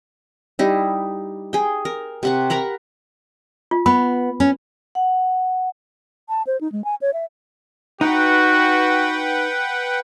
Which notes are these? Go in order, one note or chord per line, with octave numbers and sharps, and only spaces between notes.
G3 D#4 E4
G#4 G5
A#4
C3 F#5 C#6
A#4 F#5 A#5 B5
F4
B3 B5
C#4
F#5
A5
C5
D#4
G#3
G#5
C#5
E5
D#4 F#4 B4 F#5 G5